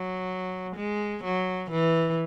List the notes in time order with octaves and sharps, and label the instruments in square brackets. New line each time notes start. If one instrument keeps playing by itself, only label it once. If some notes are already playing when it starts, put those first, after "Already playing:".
Already playing: [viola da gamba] F#3
G#3
F#3
E3